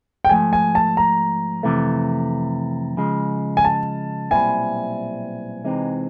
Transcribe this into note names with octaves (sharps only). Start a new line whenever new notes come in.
G5
G#2 F3 A3 G#5
G#5
A5
A#5
F2 C3 E3 A3
C#3 F3 G#3
G#5
A5
B1 A#2 G3 C4 E4 G#5
C3 E3 G#3 C4 D#4